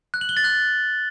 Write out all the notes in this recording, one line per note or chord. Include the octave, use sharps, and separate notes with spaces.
F#6
F#7
G7
A6
F#6